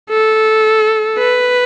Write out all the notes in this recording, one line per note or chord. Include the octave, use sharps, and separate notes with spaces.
A4
B4